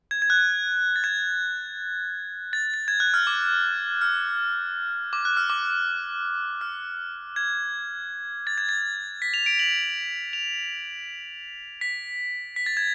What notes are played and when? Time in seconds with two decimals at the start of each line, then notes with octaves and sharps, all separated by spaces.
0.11 G#6
0.22 G#6
0.30 F#6
0.96 A6
1.04 G#6
2.53 A6
2.74 A6
2.88 G#6
3.00 F#6
3.14 F6
3.27 D6
4.01 F6
5.13 D6
5.25 F#6
5.37 F6
5.50 D6
6.61 F6
7.36 G#6
8.47 A6
8.58 G#6
8.69 A6
9.22 B6
9.34 F7
9.46 D7
9.59 F#7
10.33 F7
11.81 B6
12.56 B6
12.66 A6
12.77 G#6